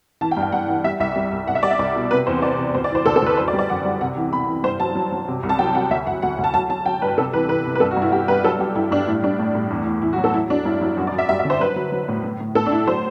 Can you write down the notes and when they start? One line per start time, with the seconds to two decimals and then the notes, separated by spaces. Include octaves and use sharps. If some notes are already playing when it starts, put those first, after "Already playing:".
0.21 E3 A5
0.31 G5
0.37 G2
0.43 G5
0.52 G2 F#5
0.68 E3
0.84 G3 E5
1.00 C2 E5
1.16 G3
1.32 C2
1.48 C2 F#5
1.55 E5
1.63 G3 D5
1.71 E5
1.79 C2 D5
1.95 B2
2.11 C3 B4
2.27 E2 C5
2.42 C3 D5
2.58 C3
2.74 D2 C5
2.84 D5
2.91 E3 C5
3.06 D2 A4
3.16 A4
3.22 D2 B4
3.37 F#2 C5
3.48 D5
3.53 G3
3.59 D5
3.69 F#2 F#5
3.85 G3
4.01 C3 F#5
4.17 E3
4.33 C3 B5
4.48 E3
4.64 G2 C5
4.80 F#3 A5
4.95 F#3
5.12 F#3
5.28 C3
5.43 C2
5.49 A5
5.59 F#3 G5
5.75 F#3 F#5
5.90 D2 E5
6.06 D2 F#5
6.22 D2 F#5
6.38 D2
6.44 A5
6.54 F#3 A5
6.69 F#3 A5
6.86 F#3 G5
7.02 G2 B4
7.18 C3 A4
7.33 E3 B4
7.49 E3 B4
7.65 C3
7.75 B4
7.80 G2 A4
7.91 F#4
7.97 G2
8.02 E4
8.12 G2 G4
8.28 G2 B4
8.44 F#3 A4
8.59 F#3 G4
8.75 G2 E4
8.91 G2 D4
9.07 A2 E4
9.23 G3 D4
9.39 A2
9.55 A2
9.70 E2
9.86 E2
10.02 E2 E4
10.13 F#4
10.18 F#3
10.24 A4
10.33 F#3 E4
10.50 F#3 D4
10.65 G2 E4
10.81 F#3 E4
10.97 F#2 F#4
11.07 D5
11.13 F#2
11.18 E5
11.29 G3 E5
11.39 E5
11.45 D3
11.50 C5
11.60 F#3 B4
11.76 F#3
11.92 F#3
12.08 A2
12.23 A2
12.40 A2
12.55 A2 A4
12.66 D4
12.71 A2 E4
12.87 F#3 C5